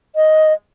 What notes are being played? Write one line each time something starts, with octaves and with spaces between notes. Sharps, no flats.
D#5